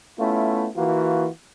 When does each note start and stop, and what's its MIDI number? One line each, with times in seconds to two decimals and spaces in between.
0.19 0.68 57
0.19 0.68 59
0.19 0.68 61
0.19 0.68 64
0.19 0.68 65
0.76 1.28 52
0.76 1.28 58
0.76 1.28 65
0.76 1.28 66